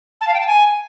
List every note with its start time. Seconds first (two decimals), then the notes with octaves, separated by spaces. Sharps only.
0.21 A5
0.27 F5
0.34 G5
0.40 A5
0.47 G#5